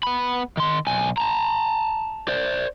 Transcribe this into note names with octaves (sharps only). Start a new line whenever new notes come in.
B3 B5
D#3 C6
B1 G#5
A5 A#5
C5 D5